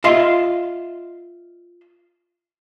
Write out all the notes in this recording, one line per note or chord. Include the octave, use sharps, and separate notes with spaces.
F4 D#5 E5 C6